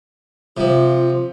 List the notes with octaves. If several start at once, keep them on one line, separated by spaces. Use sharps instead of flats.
C3 F3 F4